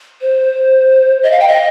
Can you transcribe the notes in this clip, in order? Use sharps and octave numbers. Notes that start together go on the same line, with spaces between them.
C5
D#5
F5
G5
D#5